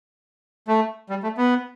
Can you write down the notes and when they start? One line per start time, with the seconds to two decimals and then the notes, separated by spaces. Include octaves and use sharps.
0.68 A3
1.10 G3
1.23 A3
1.38 B3